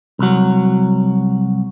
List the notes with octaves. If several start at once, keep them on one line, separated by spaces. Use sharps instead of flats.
C2 F#3